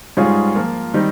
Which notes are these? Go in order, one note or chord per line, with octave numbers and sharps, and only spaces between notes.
G#2 G3 C#4 F4 G#4
F3 A#3 F4
D#3 G3 C4 D#4